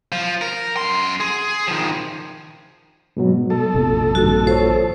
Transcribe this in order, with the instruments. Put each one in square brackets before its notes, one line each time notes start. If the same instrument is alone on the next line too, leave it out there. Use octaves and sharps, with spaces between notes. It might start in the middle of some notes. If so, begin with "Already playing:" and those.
[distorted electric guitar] F3
A#4
F#2 C6
G#4
D#3 F3
[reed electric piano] G#2 B2 F#3
[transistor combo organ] A4
[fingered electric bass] A#1 F2 C3
[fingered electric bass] A#1 [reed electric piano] G2 D#3 [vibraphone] F#4
[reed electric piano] F4 C#5 [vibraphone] C5